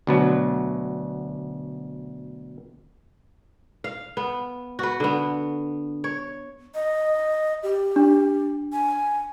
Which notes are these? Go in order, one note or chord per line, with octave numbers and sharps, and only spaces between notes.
D2 B2 F#3
F5
B3
F#4 B4
D3 B3
C#5
D#5
G4
D4
G#5